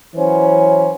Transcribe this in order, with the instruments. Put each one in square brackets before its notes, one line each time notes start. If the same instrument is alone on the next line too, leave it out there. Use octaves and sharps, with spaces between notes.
[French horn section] E3 F#3 C#4 C5